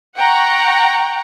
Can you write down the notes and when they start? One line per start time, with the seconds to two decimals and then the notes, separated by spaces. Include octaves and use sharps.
0.17 F#5 G5 A#5 C#6